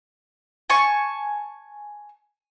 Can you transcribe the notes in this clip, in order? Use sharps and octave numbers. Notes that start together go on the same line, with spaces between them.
G#5 A5 C#6